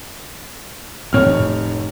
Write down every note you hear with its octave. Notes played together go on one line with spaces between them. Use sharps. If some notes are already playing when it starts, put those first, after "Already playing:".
F1 D2 A2 C4 C#5 F6
A2